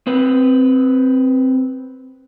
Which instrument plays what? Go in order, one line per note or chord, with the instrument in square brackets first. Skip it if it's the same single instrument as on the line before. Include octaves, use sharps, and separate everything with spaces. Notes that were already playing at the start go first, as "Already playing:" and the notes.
[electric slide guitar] C4 B4